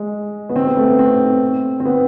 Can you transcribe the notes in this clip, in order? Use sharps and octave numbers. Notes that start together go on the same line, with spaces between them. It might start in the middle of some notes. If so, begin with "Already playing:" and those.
Already playing: G#3
B3
C4
B3
A3
B3
C4
C4
B3